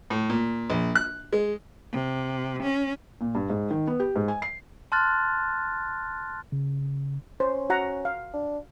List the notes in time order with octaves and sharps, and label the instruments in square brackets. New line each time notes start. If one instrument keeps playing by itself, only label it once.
[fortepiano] A2
A#2
A#1
F#6
G#3
[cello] C3
C#4
[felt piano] A#2
G2
G#2
D#3
B3
G4
G#2
G#5
C7
[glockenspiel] A5 C6 F6 F#6 A6
[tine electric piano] C#3
[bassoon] C#4 [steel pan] C5
[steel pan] F#4 F#5 A#5
F5
[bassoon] D4